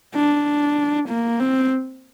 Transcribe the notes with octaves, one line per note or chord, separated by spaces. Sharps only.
D4
A#3
C4